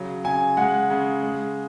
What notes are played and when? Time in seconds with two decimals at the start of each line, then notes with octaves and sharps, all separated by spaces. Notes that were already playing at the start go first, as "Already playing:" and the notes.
Already playing: C#3 F#3
0.24 C#3 G#5
0.57 G#3 F#5
0.90 C#3
1.23 G#3